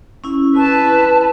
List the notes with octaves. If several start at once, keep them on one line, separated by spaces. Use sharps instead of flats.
C#4 E4
E4 B4 A5